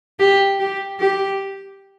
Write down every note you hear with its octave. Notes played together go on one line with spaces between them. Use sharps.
G4
G4
G4